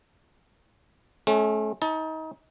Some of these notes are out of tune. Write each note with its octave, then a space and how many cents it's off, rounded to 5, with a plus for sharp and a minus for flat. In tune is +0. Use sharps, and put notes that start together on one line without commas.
A3 -40 C#4 -15
D#4 +30 A5 +0